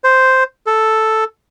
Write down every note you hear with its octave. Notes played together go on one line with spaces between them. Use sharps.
C5
A4